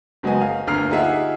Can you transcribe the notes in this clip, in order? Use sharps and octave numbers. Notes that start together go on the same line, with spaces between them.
F#1 F#3 G#3 B3 D#5 G#5
F5
G1 D2 A#3 A#4 F6 C7
D#4 F4 G4 G#4 E5 F#5